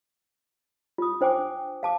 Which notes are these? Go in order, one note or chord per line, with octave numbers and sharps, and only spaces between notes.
F4 D#6
D4 C5 G5 G#5 D6
F5 A5 D6